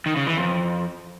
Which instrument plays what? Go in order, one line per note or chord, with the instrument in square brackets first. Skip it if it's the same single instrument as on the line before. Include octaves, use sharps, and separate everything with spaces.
[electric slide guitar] D#3
C#3
E3
F2